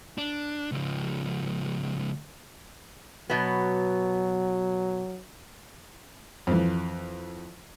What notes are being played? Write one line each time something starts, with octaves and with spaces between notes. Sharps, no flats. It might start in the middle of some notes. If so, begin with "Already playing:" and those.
D4
C#2 F3
B2 F#3 B3
F2 E3